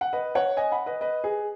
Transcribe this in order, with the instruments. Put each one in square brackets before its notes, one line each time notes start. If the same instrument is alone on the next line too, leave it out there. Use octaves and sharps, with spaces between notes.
[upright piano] F#5
B4 D#5
C#5 F#5
D#5 G#5
F#5 B5
B4 D#5
B4 D#5
G#4